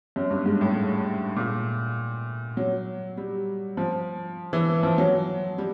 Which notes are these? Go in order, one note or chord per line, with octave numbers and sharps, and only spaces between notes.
F#2
G2
G#2
A2
A#2
F#3
G3
F3
E3
F3
F#3
G3